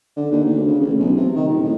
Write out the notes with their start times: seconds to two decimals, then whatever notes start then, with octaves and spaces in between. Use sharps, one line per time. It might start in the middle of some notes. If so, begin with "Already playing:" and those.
0.16 D3
0.32 D#2
0.46 D2
0.67 C#3
0.81 A1
0.99 B1
1.16 C3
1.35 D#3
1.49 D#1
1.64 A2